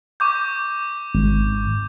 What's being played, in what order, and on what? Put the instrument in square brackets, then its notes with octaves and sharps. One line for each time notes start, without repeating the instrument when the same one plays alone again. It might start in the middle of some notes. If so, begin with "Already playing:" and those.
[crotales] C#6 D6 G6
[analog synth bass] G#1